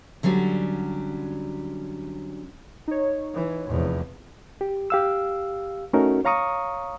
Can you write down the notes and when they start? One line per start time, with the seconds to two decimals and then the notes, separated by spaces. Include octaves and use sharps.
0.23 D3 F#3 G3 C#4
2.88 D#4 C#5
3.34 E3
3.67 F1 E2
4.61 G4
4.90 G4 F5 E6
5.93 A3 C#4 D#4 F#4 A#4
6.25 C#5 F5 A#5 C#6 D#6